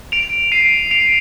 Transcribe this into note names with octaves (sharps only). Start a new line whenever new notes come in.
D7 F7
C7 D#7
D7 F7